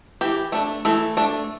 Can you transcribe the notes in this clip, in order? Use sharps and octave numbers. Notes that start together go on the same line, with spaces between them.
E3 G4
A3 D4
E3 A3 A4
A3 D4